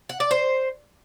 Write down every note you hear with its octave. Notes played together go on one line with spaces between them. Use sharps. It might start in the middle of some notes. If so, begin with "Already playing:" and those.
F#5
D5
C5